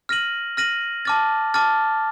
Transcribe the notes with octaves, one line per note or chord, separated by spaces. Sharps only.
F6 A#6 D#7 F#7
F6 A#6 D#7 F#7
A5 D6 F6 A6
A5 D6 F6 A6